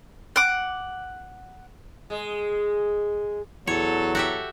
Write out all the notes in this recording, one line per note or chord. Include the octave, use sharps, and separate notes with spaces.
F#5 D6
G#3
E2 F#3 A4 C#5
F#4 G4 E5